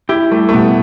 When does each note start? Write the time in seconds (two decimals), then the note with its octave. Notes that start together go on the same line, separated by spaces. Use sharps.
0.09 E4 G4
0.31 G3 A3
0.49 A3
0.53 B2 B3